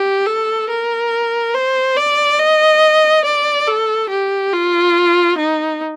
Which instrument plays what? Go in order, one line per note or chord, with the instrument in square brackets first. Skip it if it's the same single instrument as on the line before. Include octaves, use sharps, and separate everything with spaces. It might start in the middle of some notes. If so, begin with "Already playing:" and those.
Already playing: [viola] G4
A4
A#4
C5
D5
D#5
D5
A4
G4
F4
D#4